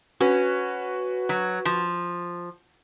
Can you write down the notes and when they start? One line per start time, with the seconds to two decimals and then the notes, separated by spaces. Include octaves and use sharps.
0.20 C#4 F#4 B4
1.29 F#3
1.65 F3